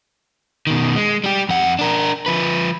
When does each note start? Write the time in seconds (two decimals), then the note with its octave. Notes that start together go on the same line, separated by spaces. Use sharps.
0.67 B2 D#3
0.96 G#3
1.24 G3 G4
1.49 F2 F#5
1.79 D4 A#4
2.26 F3 B4